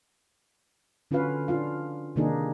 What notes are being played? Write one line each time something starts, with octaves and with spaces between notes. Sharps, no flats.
D3 C#4 F4 F#4 B4 F5
D4 F4 F5
C3 D#3 A#3 D4 D#4 G#4